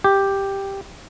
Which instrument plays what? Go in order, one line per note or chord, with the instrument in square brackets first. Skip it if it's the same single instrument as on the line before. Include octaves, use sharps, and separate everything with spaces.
[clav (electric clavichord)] G4